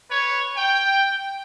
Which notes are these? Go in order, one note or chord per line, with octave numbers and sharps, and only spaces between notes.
B4 C#5
G5